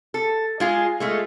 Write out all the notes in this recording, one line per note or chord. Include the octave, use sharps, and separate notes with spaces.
A4
G#3 F4 G#4
G#3 A3 F4